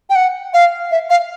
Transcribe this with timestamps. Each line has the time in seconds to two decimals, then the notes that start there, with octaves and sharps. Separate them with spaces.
0.10 G5
0.16 F#5
0.54 F5
0.91 E5
1.10 F5